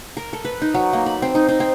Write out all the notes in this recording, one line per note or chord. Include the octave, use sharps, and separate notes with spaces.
A#4
A4
B4
D#4
F#3
A#3
B5
C4
D#4
D#4
C4